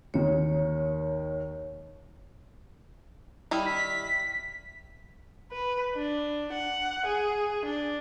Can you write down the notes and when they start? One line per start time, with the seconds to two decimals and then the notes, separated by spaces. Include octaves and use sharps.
0.14 D#2 D#3 C#5
3.51 D#3 G3 E4
3.66 B6
5.52 B4
5.95 D4
6.53 F#5
7.06 G#4
7.65 D4